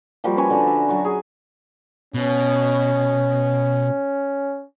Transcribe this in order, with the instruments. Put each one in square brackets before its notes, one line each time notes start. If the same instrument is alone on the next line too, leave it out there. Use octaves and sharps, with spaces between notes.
[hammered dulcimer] F3 G3 A#3 F#4
C#4 B4 C#5 G#5
D3 D4 D5
E5 A#5
F#3 C#6
G#4
[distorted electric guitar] B2 [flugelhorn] C#4